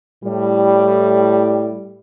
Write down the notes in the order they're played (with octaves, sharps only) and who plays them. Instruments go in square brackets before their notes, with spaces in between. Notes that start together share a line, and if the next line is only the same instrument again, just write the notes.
[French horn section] A2 G3